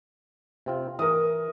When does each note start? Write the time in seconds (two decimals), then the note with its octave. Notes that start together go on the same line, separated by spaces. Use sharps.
0.66 C3 C4 F4
0.99 E3 A#4 D#6